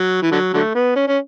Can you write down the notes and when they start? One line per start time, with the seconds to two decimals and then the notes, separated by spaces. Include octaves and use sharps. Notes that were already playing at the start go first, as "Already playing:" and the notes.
Already playing: F#3
0.22 E3
0.32 D3 F#3
0.54 D3 F#3 A3
0.75 B3
0.96 C#4
1.08 C#4